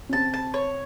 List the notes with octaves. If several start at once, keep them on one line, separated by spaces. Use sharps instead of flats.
C#4
C3 C4 A5
A5
C#5